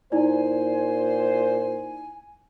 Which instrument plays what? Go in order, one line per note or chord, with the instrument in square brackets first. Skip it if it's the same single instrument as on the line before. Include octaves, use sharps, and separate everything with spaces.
[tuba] A#2 [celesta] D#4 E4 D5 [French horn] C5 [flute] G#5